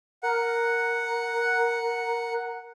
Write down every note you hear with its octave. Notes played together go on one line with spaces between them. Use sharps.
A#4 F#5